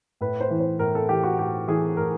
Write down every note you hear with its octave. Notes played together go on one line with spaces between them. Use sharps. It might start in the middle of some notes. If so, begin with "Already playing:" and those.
A2 B4
C5
E3
C5
A2 A#4
A4
E3 G4
F#4
A2 G4
E3 G#4
A2 A#4